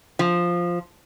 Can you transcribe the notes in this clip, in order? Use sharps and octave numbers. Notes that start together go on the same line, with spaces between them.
F3